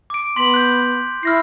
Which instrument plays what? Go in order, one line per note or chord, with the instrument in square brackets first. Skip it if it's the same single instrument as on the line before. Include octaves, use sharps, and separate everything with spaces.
[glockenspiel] D6 D7
[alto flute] B3 [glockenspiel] C6 B6 F#7
[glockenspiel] F#6 G6
[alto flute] E4 [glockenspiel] F6 A#6 C7